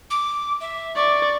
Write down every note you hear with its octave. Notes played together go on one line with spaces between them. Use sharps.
D6
E5
D5 C#6